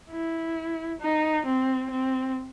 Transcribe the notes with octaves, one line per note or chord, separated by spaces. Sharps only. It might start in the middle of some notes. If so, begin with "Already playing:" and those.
E4
D#4
C4
C4